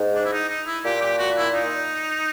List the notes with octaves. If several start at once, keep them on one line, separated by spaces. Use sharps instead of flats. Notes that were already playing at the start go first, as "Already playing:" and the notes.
Already playing: G#2
D4
E4
D#4
D#4
E4
A#2 G4
G4
F#4
E4
D#4